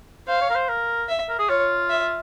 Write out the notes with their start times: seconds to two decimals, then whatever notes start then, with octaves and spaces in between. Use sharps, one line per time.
0.28 C5 F5
0.41 C#5
0.50 A#4
0.55 C5
0.69 A#4
1.09 E5
1.29 A#4
1.39 G#4
1.49 F4 C#5
1.90 E5